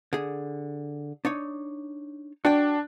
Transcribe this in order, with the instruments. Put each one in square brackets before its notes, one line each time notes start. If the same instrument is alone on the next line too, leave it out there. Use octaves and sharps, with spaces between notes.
[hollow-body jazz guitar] D3 G#4
D4 D#4 C#5
[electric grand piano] D4 [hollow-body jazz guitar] F#4 D5 G5